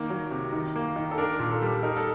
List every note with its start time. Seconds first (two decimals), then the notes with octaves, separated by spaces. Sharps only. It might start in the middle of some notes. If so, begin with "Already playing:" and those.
Already playing: D#3 A#3 A#4
0.10 F#3
0.31 C3
0.53 D#3
0.75 A#3
0.96 D#3
1.11 A4
1.18 D4 A#4
1.39 A#2
1.51 A4
1.62 G3
1.83 D#4 A#4
1.97 A4